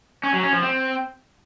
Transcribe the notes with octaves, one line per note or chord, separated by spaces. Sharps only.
C#4
F#3
C#4
F3
C4